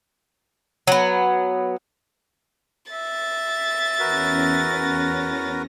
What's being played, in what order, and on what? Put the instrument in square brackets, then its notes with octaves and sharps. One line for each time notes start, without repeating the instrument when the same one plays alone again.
[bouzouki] F#3 B3
[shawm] E5 [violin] A6
[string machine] E2 C#4 A#6 [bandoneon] F#4 A#4 B4